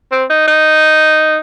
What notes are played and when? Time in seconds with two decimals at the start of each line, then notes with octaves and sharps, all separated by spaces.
0.12 C4
0.30 D#4
0.48 D#4